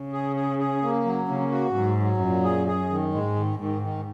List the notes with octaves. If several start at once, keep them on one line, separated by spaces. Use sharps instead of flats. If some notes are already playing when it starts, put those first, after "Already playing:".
Already playing: C#3
G#4
G#4
G#4
A#3
F#3
C#3 A#3
F#4
G#2 F#3
F#3
F#2 A#2
G#4
G#4
D#3
G#2 G#3
D#3
G#2 D#3
D#3